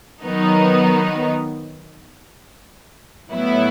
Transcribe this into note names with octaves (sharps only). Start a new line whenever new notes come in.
D#3 F#3 B3 D#4
A2 F#3 B3 E4